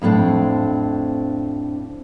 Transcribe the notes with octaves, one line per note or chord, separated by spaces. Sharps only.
F2 A2 C4 D4